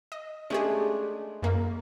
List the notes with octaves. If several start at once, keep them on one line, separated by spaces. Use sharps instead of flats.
D#5
G#3 A3 C#4 D4 G4 G#4
F#2 A#3